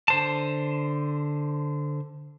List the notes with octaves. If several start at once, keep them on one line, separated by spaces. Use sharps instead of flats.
D3 C5 A5